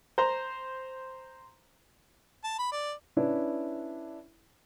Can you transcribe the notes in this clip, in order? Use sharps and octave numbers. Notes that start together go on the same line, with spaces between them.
C5 A#5 C6
A5
B5
D5
C#4 D4 E4 B4